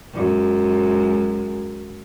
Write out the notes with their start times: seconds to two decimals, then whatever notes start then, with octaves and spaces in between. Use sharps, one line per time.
0.14 F#2 G#3